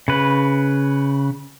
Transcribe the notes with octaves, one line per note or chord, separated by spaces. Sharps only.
C#3 B4